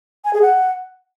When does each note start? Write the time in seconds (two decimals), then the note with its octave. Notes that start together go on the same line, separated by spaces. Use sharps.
0.25 G#5
0.33 G#4
0.42 F#5